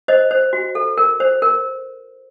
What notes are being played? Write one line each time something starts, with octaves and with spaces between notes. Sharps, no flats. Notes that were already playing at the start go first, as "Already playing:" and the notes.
C5 D#5
C5
F#4
A4
A#4
C5
A#4